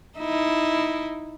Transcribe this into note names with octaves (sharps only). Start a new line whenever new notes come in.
D#4 E4